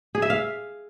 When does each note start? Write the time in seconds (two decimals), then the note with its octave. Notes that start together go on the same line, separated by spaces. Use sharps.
0.15 G#4
0.22 E5
0.30 F5